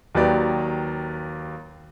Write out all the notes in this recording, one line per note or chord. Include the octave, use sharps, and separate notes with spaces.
D#2 F#3 G4 B4 D5